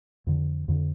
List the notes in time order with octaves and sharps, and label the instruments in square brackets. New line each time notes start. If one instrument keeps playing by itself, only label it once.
[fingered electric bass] F2 D3
F2 D3